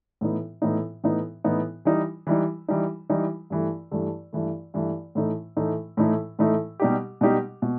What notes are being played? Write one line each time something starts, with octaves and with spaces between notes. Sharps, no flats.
A2 E3 B3 D#4
A2 E3 B3 D#4
A2 E3 B3 D#4
A2 E3 B3 D#4
E3 G3 D#4
E3 G3 D#4
E3 G3 D#4
E3 G3 D#4
G2 E3 A3
G2 E3 A3
G2 E3 A3
G2 E3 A3
A2 E3 A3 D#4
A2 E3 A3 D#4
A2 E3 A3 D#4
A2 E3 A3 D#4
B2 G3 D#4 G4
B2 G3 D#4 G4
B2